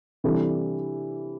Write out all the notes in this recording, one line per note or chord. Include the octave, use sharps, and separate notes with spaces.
C3 E3 G3 D4 A4